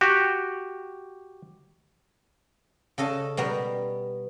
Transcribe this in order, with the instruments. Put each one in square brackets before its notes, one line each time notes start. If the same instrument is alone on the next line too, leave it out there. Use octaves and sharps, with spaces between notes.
[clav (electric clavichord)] F#4 G4
[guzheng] C#3 A4 D#5 A5
B2 G3 B3 A#4